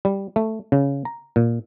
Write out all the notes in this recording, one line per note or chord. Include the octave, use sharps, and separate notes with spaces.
G3
A3
C#3
A#5
A#2